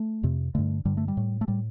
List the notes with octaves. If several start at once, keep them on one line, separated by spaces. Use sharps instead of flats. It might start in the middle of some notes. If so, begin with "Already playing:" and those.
Already playing: A3
F2 C3
G2 D3 A3
G2 D3 G3
A3
G3
A2
A3
A2 G3